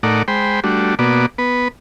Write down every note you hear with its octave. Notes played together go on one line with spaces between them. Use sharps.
A2 A3 D#4 A#4 D5 F#5
G#3 C5 G5 B5
G3 A3 D4 F#4
B2 A#3 B3 F#4 D5
B3 B4